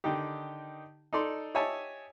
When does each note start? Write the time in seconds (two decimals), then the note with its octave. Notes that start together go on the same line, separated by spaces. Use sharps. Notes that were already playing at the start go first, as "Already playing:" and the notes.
0.04 D3 D#3 D#4 G4
1.13 D#4 A4 D5 C6
1.54 G4 C#5 D#5 E5 G#5 A5